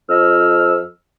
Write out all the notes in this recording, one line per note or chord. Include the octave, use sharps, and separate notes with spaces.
F2 F3 D#5 E6 F6